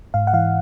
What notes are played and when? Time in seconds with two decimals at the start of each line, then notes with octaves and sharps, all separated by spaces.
0.14 G#2 F5
0.27 F#5
0.33 E3 F5